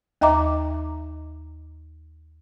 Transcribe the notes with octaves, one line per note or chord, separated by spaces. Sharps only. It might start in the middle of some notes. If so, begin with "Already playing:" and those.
D#2 D#5 E5 A#5 D6